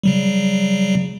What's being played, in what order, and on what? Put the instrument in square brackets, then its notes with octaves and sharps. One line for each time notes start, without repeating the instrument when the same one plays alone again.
[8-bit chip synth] C#3 F#3 G3